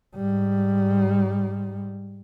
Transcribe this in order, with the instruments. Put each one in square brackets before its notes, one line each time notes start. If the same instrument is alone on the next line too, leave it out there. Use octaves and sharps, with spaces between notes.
[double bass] G#2 G3